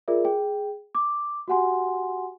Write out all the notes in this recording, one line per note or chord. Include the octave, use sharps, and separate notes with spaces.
F4 G#4 A#4 D5 E5
G#4 G5
D6
F#4 G4 F#5 G#5 C6